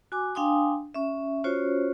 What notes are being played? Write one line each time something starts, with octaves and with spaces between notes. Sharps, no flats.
F#4 G#5 D6
D4 F5 G5 G#5 C6 D#6
C#4 E5
C#4 F4 F#4 C5 C#5